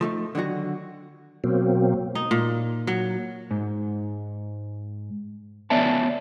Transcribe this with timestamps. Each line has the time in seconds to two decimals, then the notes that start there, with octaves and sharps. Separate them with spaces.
0.01 F3 A3 D#4
0.35 D3 D#3 F#3 F#4
1.44 B2 F#3 A#3 C4
2.15 D#4
2.31 A#2
2.87 F#3
3.51 G#2
5.70 B3 C#5 D5 E5 G#5 A5